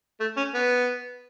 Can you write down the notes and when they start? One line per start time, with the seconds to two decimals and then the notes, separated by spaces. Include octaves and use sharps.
0.20 A3
0.37 C#4
0.54 B3